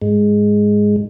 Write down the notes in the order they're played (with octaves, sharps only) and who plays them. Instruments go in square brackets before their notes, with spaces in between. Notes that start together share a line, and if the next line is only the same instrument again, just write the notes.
[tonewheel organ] G#2 G#3